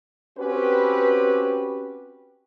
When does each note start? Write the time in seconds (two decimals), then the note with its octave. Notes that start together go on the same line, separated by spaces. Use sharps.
0.39 C4 C#4 F#4 G4 B4